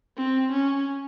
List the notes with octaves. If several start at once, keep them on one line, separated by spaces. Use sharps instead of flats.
C4
C#4